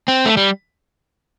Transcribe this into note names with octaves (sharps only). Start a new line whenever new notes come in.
C4
A3
G3